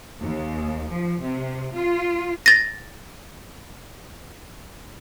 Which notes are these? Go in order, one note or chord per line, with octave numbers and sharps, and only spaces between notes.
D#2
F3
C3
F4
A6 A#6